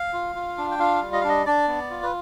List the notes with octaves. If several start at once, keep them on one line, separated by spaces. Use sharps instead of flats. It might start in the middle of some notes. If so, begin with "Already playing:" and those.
Already playing: F5
F4
F4
D4
G5
F4 F5
G3
D#5
F5
D4 D#5
D4 D5
B3
F4
B4